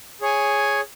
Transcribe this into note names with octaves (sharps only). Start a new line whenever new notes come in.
G#4 C#5 G#5